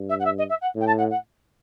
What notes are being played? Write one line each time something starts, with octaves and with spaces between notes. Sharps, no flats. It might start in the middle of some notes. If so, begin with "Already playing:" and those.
Already playing: G2
E5
F#5
E5
D#5
E5
F#5
A2
G5
A5
F#5
F#5